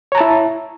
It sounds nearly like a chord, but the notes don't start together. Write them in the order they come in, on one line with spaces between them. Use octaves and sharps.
C#5 A#5 A5 E4